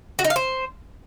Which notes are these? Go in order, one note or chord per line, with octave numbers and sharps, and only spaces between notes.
F#4
D#4
F5
C5